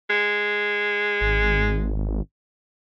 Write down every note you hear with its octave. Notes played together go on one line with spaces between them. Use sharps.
G#3
G#1